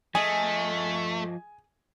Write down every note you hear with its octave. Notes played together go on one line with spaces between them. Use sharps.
F3 A3 G#4 D#5 G#5